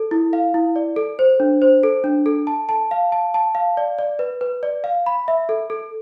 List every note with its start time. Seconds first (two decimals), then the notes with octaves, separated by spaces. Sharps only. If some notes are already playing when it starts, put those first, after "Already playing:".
Already playing: A4
0.11 E4
0.33 F5
0.54 E4
0.76 D5
0.96 A4
1.19 C5
1.40 D4
1.62 C5
1.83 A4
2.04 D4
2.26 A4
2.47 A5
2.69 A5
2.91 F5
3.12 A5
3.34 A5
3.55 F5
3.77 D5
3.99 D5
4.19 B4
4.41 B4
4.63 D5
4.84 F5
5.06 B5
5.28 E5
5.49 A4
5.70 A4